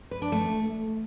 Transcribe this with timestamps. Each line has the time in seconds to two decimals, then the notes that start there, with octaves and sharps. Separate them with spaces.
0.11 B4
0.22 D4
0.32 A3